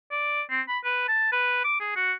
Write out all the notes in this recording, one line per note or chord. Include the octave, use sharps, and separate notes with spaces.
D5
C4
B5
B4
A5
B4
D6
G#4
F#4